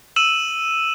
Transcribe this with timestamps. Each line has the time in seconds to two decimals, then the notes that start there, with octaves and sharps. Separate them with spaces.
0.16 E6 D#7 E7 F#7